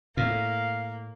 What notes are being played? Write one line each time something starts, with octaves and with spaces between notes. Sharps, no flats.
A2 A#3 F5